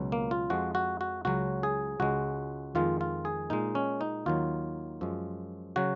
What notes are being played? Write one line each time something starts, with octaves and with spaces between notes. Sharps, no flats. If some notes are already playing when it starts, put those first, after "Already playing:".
Already playing: C#2 B2 F#3
A#3
F4
F2 F3 G#3 F#4
F#4
F#4
C#2 C#3 F#3 F#4
G#4
C#2 C#3 G#3 F#4
F2 D#3 G#3 F4
F4
G#4
A#2 G#3 D#4
C#4
D#4
D#2 D#3 F#3 F4
F#2 F3 G#3
C#3 F#3 F#4